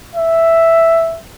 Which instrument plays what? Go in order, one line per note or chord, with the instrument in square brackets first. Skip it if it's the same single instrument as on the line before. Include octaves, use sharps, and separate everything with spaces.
[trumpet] E5